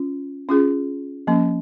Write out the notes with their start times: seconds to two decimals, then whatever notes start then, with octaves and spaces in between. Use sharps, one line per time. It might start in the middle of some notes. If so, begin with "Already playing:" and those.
Already playing: C#4 F4
0.49 C#4 F4 G#4
1.27 F3 A#3 C#4